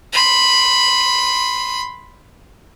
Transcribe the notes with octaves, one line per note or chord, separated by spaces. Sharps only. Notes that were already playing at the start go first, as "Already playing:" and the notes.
B5 C6